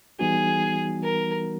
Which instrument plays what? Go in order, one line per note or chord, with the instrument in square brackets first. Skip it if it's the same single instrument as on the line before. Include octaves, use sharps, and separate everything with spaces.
[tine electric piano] E3 G3 B3 D#4 F#4 [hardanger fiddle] G#4
[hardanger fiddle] A#4